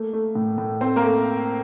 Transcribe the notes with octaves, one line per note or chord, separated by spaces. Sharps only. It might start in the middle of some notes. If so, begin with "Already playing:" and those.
Already playing: A3 A#3
A3
A2
A2
A3 C4 C5
A#3 A#4
A3